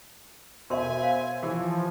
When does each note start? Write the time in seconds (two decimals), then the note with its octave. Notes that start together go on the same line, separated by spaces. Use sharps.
0.70 B2 A#4 C5 E5 G#5 C6
1.02 C#5 F5 C6
1.43 E3 F3 G4